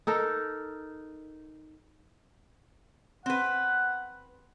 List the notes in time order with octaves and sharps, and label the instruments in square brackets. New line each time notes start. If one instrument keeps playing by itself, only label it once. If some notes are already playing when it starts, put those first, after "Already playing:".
[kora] D#4 A4 A#4
[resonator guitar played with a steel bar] C4 B4 [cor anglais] F#5